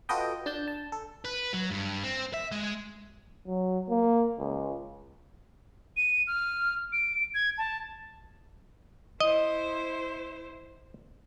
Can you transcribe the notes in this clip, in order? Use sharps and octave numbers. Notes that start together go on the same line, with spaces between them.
F4 F#4 A4 B4 D#5 G5
D4 A5 G6
A5
A4
B4
F#3
G2
C4
E5
G#3
F#3
A#3
C#2
D#7
F6
D7
G#6
A5
E4 C5 D#5